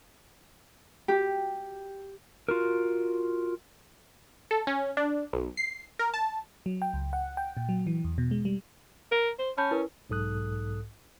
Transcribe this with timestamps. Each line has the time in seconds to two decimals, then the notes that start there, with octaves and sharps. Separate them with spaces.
1.08 G4
2.48 F4 F#4 A#4
4.51 A4
4.67 C#4
4.97 D4
5.33 B1
5.57 C7
5.99 A#4
6.14 A5
6.66 F#3
6.82 G5
6.94 C#2
7.13 F#5
7.37 G5
7.57 A#2
7.69 F#3
7.87 E3
8.04 E2
8.18 B2
8.31 G#3
8.45 G3
9.12 A#4
9.39 C5
9.58 C#4 A5 B5 G6
9.71 E4 A#4 B4
10.10 B1 G#2 A4 D#6 F#6